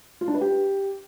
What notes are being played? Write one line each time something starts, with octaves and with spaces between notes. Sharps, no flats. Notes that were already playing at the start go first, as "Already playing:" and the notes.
F4
D4
B4
G4